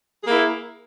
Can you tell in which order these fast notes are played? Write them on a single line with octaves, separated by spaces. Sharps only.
G#4 A#3 E4